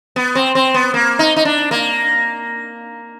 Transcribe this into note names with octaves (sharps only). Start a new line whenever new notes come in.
B3
C4
C4
B3
A#3
D#4
D#4
D4
A#3